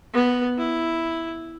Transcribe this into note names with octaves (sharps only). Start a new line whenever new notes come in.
B3
E4